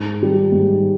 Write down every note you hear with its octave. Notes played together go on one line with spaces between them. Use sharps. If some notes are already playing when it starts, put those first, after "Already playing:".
Already playing: G#2
D#3 G3
G#2